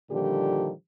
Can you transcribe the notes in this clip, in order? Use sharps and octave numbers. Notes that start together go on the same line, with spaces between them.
A#2 D3 D#3 F3 G3 G4